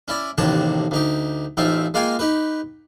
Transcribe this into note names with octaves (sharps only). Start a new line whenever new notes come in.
C#4 E4 D5
A1 D#2 C3 F#4 C#5 A5
D2 D#4 G4
A1 C4 D#4 F4 E5
G#3 A#3 F4 F5 G5 G#5
D#4 G4 B4